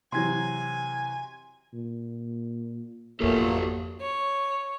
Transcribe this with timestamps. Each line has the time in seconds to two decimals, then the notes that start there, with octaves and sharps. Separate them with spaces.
0.12 C3 E3 F#3 G#5 C6 G#6
1.74 A#2
3.20 G#1 F2 A#2 F#3 A3 A#3 G4 A4
4.01 C#5